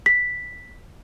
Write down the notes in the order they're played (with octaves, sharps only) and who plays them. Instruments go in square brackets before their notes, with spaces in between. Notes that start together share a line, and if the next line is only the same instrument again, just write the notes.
[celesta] B6